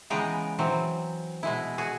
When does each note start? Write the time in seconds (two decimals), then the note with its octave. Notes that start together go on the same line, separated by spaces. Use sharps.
0.10 C#3 E3 G#3 B3 G5 A#5
0.59 E3 F#3 C4
1.43 B2 G#3 E4
1.78 F#4 G#4